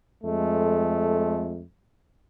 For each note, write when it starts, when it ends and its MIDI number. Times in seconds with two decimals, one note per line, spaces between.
0.23 1.63 41
0.23 1.63 56
0.23 1.63 57